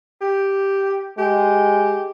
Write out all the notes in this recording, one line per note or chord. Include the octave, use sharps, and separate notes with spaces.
G4
G#3 G4